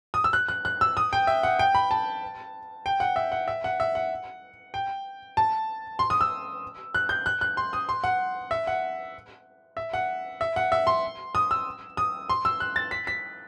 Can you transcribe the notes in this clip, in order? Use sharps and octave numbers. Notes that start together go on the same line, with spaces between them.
D#6
E6
F#6
F#6
F#6
E6
D#6
G5
E5
F#5
G5
B5
A5
G5
F#5
E5
F#5
E5
F#5
E5
F#5
G5
A5
C6
D#6
E6
F#6
G6
F#6
F#6
C6
D#6
C6
F#5
E5
F#5
E5
F#5
E5
F#5
E5
C6
D#6
E6
D#6
C6
E6
F#6
A6
B6
B6